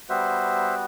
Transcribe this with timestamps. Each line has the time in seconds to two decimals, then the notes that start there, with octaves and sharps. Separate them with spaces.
0.09 G3 B3 F#4 C5 E5